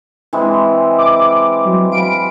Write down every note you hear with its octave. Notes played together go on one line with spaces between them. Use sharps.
E3 G#3 C4
D6
F#3
F5 B5 D7